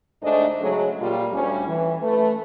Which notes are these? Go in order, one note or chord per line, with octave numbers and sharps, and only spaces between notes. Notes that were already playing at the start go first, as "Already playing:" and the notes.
D2 G#2 A3 D4 C5 D#5
C#3 F#3 G#3 A3 C#4
A#2 G3 F4
D2 G3 C#4
E3
A3 B4